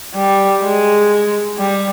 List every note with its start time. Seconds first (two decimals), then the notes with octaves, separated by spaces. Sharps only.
0.15 G3
0.63 G#3
1.58 G3